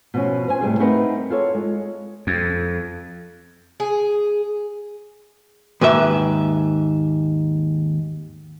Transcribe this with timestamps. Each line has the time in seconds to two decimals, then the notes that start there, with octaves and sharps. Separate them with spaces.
0.14 B2 F3 C#4
0.47 B4 C5 F5 G#5
0.61 A2 C3 G3 G#4
0.80 A3 C4 D#4 A#4 B4 F#5
1.30 F4 A4 C#5
1.55 G#3
2.27 F2
3.80 G#4
5.81 D#2 G#2 B4 E5